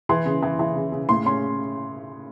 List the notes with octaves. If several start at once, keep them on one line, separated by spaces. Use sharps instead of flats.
E3 C6
C#3
E3
E3
C#3
C#3
A2 C6
C#4 C6